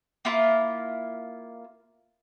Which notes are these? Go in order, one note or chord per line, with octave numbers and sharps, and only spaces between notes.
A#3 E4 F4